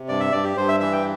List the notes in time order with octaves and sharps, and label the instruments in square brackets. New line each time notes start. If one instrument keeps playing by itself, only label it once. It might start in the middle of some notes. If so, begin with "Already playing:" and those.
Already playing: [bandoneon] C3
G2 D5
E5
G2 D5
G4
G2 C5
E5
E3 E5
G5